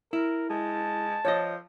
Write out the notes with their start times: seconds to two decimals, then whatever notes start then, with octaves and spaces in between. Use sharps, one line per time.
0.13 E4 A#4
0.50 G#3 A5
1.25 F3 C#5 D#5